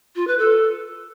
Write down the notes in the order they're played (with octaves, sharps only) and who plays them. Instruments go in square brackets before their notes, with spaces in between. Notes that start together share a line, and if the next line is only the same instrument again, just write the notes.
[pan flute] F4
B4
A4